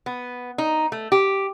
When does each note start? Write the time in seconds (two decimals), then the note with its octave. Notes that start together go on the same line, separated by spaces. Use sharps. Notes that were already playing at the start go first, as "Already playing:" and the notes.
0.06 B3
0.58 D#4
0.92 A3
1.12 G4